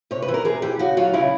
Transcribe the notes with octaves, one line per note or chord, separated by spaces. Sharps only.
C3 C#5
B4
E3
A#4
C3 G#4
E3 G4
C#3 F#4
F#3 F4
C#3 E4